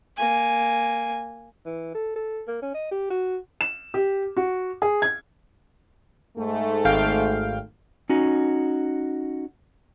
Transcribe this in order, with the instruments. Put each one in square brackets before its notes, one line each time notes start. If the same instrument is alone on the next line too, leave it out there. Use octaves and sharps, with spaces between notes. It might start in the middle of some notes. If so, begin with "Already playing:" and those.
[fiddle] A#3 G#5
[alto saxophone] E3
A4
A4
A#3
C#4
D#5
G4
F#4
[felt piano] E7
G4
F#4
G#4
G#6
[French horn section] G#2 A3
[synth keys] G#1 F5 G5
[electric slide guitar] C#4 D#4 F#4